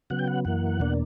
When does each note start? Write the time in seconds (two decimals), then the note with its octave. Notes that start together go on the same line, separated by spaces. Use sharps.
0.10 C#3 F#3 B3 F#5
0.19 G5
0.28 F#5
0.45 F#2 E3 A#3 F#5
0.80 E2 B2 A#3 D4